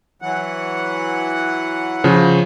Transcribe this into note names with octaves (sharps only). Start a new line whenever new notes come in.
E3 F#3 F#5
C#3 F3